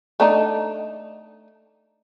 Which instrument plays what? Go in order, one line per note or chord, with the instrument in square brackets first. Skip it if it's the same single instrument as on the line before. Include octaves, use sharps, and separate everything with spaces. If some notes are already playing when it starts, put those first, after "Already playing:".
[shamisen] A3 D4 D#4